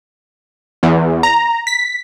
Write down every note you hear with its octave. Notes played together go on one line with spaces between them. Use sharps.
E2
A#5
B6